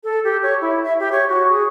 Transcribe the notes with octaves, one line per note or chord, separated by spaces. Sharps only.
A4
G4
C#5
E4
E5
G4
C#5
F#4
G#4